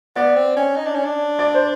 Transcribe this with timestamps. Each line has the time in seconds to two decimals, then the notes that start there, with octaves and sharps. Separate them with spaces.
0.16 B3 D5
0.36 C4
0.56 C#4
0.77 D#4
0.86 D4
0.96 C#4
1.05 D4
1.39 D5
1.54 C5